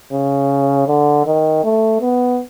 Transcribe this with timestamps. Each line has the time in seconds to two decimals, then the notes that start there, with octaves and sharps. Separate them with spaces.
0.12 C#3
0.88 D3
1.26 D#3
1.64 A3
2.01 B3